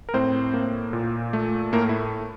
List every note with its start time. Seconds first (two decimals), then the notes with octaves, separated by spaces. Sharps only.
0.09 A#4
0.14 A2 C4 C5
0.54 A#3
0.93 A#2
1.33 A3
1.73 A2 A#3 A#4
1.89 E4